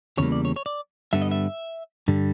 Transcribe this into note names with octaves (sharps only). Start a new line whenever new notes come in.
E2 C#3 E3 G3 A#3 C#5
D5
C#5
C#5
D5
G2 D3 G3 B3 E5
D#5
E5
G2 D3 G3